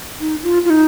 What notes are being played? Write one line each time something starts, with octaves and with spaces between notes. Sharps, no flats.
D#4
F4
F4
D#4